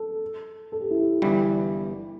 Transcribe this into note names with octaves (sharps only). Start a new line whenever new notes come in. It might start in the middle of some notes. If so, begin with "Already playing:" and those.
Already playing: A4
A4
G4
E4
G4
G1 G2 E3 G3 E4